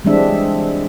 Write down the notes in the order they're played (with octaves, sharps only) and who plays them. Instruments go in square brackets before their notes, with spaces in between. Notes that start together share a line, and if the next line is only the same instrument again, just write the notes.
[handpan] E3 G3 G#3 C4 D4 E5